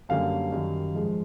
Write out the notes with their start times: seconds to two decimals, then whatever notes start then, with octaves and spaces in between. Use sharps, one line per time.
0.09 F#2 D3 G3 A#3 C#4 F5
0.52 F#2 D#3 G3
0.95 G#2 F3 G#3